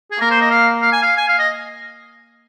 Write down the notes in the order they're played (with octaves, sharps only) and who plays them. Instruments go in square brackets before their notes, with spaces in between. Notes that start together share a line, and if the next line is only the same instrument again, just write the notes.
[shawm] G#4
[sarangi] A#3 [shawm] A#4
[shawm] C5
D#5
F5
F5
G#5
F5
G#5
F5
D#5